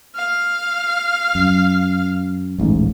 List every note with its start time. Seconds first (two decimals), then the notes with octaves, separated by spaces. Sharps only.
0.15 F5
1.35 F#2
2.58 D#1 A1 G#2